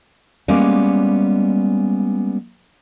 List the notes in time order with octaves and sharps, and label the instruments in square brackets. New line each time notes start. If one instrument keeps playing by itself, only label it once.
[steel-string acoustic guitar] G3 G#3 A#3 B3 C#4